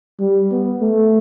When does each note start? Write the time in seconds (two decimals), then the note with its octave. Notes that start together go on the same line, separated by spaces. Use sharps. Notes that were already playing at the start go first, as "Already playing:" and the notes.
0.20 G3
0.51 B3
0.81 A3